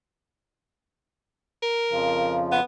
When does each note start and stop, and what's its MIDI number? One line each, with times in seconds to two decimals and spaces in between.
1.62 2.41 70
1.91 2.60 41
1.91 2.60 49
1.91 2.60 53
2.52 2.62 59